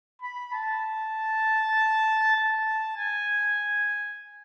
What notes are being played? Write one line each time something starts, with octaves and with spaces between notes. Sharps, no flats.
B5
A5
A5
G#5